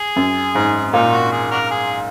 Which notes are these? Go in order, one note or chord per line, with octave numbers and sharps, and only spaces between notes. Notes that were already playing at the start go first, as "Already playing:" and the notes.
Already playing: G#4
F#2
G#2
A#2 D#4
F#4
G#4
D4 F#4 A#4
G#4